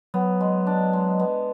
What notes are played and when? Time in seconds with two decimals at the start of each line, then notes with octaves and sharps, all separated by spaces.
0.14 F#3 B3
0.40 G#3
0.67 D4
0.93 G#3
1.19 B3